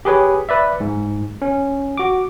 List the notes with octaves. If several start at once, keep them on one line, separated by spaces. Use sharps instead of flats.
G4 G#4 B4 C#5
B4 D5 E5
G#2
C#4
F#4 D6